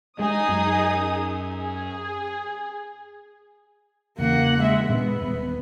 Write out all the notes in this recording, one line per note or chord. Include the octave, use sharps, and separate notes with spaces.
G#3 D#4 G#4 D#6
F#2
G#4
E2 C#3 A#3 F#5
G#3 E5
A#2 G#3 B3 D4
D#1